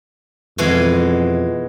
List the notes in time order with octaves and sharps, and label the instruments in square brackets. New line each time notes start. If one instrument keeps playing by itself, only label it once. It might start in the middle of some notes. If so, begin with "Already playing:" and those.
[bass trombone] F2 [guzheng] B2 E3 G#3